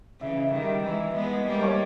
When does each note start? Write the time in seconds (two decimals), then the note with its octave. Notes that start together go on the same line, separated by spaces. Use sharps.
0.21 C#3 E3 E5
0.39 D#5
0.45 E5
0.53 D#3 G3
0.84 E3 G#3
0.92 E5
1.15 G#3 B3 D#5
1.47 G3 A#3
1.63 C#5